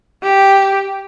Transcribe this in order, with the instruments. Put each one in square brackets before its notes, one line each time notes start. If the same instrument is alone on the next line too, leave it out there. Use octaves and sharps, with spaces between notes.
[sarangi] G4